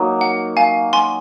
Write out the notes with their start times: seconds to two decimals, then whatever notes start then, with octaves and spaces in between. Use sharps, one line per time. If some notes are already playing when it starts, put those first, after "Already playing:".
Already playing: F#3 A#3 D#4
0.21 F#5
0.57 F5 G#5
0.93 G#5 C6